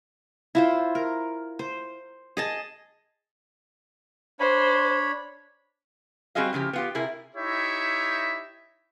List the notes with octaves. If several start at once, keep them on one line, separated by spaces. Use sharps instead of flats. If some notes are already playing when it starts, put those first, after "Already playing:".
E4 F4 C5
A#4
C5
G#4 D#5 A5
D4 C5 C#5 B5
G3 C4 F#4 G#4 D#5 F5
A2 C#3 F3 G4
B3 F4 G4
C3 E4 G#4 A#4
D#4 E4 G4 C#5 E5